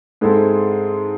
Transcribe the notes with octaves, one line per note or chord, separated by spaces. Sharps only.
G#2 G#3 C4 E4 A4